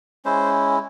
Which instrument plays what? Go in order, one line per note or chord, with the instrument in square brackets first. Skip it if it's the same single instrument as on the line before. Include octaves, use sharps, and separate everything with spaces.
[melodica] G#3 C#4 E4 C5